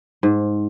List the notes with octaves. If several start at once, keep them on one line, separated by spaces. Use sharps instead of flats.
G#2